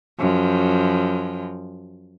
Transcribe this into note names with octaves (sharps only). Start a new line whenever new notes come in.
F#2 F3